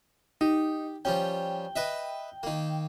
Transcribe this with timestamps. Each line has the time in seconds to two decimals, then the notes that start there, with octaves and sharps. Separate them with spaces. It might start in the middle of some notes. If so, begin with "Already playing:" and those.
0.41 D#4 G4
1.05 F3 G3 C#4 G5
1.76 B4 D#5 E5
2.43 D#3 A#3